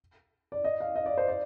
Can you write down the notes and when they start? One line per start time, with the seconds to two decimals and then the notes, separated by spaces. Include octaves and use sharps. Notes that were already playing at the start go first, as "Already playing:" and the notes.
0.52 D5
0.64 D#5
0.80 F5
0.96 D#5
1.06 D5
1.17 C5
1.28 D5